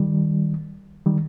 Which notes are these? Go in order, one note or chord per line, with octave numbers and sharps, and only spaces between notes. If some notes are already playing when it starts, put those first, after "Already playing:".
Already playing: D#3 G3
D#3 G3